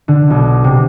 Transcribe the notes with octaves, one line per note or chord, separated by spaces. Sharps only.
D3
B1
C3